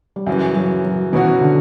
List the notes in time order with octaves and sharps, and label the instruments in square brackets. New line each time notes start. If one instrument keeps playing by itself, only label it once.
[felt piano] G3
[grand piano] F#2 C#3 E3 [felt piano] F#3
[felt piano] F#3
F#3
[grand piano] B2 F#3 C#4 F#4 [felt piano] E3
[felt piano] D3